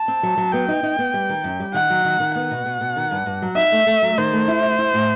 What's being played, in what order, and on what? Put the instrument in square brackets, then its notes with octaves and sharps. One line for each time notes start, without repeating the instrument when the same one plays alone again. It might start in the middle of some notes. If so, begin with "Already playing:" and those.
Already playing: [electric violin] A5
[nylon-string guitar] C4
F#3
F#3
[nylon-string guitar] B3 [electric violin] G5
[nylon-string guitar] D#4
D#4
B3
G3
D#3
F#2
G3
[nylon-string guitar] D#3 [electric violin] F#5
[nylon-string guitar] F#3
D#3
D#3
[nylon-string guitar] B3 [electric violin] F#5
[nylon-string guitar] B2
B2
B2
D#3
G2
G2
F#3
[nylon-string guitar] D#4 [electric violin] E5
[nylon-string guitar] A3
A3
F#3
[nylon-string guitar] D#3 [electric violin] C5
[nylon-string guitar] A3
E4
E4
E4
A2